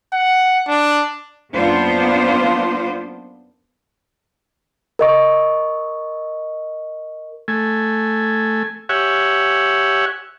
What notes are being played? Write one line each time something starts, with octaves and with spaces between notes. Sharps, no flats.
F#5
D4
F#2 A#3 B3 D4 F4 C5
A#4 D#5 C#6
A3 G#5
G4 C#5 E5 F#5 G#5